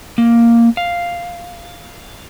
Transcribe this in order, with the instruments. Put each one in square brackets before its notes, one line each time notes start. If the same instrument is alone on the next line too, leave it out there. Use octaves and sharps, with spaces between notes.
[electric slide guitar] A#3
F5